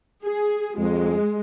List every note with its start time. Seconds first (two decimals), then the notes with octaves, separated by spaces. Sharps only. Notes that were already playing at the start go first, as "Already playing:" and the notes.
0.25 G#4
0.78 F2 G#3